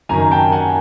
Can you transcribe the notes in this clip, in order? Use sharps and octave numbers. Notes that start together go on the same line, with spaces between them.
F#2 D#3 G#5 A#5
G5 A5
F#5 G#5